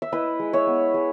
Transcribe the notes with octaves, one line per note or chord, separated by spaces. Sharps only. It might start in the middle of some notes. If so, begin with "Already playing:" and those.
E5
E4 B4 D#5
G#3
C#5 E5
B3
G#3